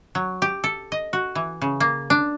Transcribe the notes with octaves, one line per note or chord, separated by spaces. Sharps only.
F#3
G4
A4
D#5
F#4
E3
C#3
A#3
D4